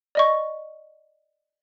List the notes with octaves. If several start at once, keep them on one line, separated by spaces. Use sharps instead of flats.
D5 D#5 C#6